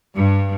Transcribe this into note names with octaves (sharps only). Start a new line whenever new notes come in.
G2